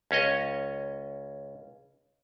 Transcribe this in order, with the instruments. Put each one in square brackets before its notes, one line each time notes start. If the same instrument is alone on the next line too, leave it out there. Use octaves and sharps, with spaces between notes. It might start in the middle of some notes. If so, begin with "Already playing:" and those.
[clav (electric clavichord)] C#2 C#4 C#5 D#5